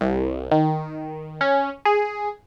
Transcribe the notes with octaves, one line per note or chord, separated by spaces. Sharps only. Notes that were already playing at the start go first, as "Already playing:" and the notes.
C2
D#3
C#4
G#4